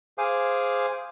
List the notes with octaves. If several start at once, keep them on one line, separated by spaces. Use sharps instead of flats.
G#4 C5 F5 G#5 D6